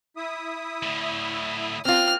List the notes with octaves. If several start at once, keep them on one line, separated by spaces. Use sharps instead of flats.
E4 E5 D#6
A2 D3
A#3 C4 F4 F6 F#6